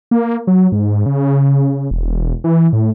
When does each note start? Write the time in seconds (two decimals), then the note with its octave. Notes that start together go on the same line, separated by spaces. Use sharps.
0.11 A#3
0.47 F#3
0.72 G#2
1.06 C#3
1.91 E1
2.44 E3
2.73 A2